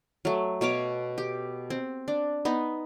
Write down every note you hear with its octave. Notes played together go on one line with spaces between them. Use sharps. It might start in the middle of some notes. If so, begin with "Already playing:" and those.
F#3 A3
B2 C#5 F5 D6
G4
C4
D4
B3 D#4